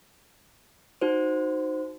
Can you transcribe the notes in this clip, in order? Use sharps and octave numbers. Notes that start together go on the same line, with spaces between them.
D#4 F#4 C5